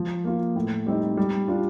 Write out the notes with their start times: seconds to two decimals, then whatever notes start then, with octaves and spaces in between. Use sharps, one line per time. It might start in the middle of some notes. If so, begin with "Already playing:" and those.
Already playing: F3
0.24 A#3 F4
0.56 A2
0.86 G3 C4 D#4
1.17 G3
1.48 D4 F4